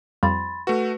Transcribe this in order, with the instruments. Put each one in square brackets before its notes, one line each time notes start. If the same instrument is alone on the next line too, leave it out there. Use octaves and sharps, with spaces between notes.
[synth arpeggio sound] F2 F3 G3 [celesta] B5 C6 A6
[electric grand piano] A3 F#4 [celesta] B4